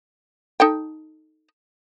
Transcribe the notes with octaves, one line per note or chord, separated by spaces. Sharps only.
D#4 A4 G5